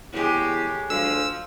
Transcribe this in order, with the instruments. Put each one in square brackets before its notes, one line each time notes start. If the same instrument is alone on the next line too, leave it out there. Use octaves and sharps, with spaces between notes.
[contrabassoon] E2 [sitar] A2 G#3 [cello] G4
[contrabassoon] D2 [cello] F3 [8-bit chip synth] E6